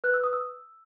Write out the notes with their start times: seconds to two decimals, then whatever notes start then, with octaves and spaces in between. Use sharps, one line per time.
0.04 B4 F#6
0.14 E6
0.24 D#6
0.33 E6